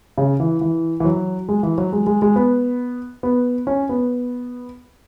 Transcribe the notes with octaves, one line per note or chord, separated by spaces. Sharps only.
C#3
E3
E3
E3
F#3
G#3
E3
F#3
G#3
G#3
G#3
B3
B3
C#4
B3